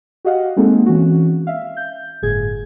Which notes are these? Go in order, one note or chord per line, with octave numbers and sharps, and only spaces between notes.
F#4 G4 D#5 F5 F#5
G#3 A#3 C4 D#4 G#4 A4
E3 C#4 F#4
E5 F5
G6
G1 A2 G#4 G#6